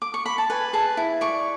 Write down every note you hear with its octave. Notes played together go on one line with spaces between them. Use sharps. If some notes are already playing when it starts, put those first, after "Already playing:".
D6
C#6
B5
A5
B4 G#5
G#4 A5
E4
D5 C#6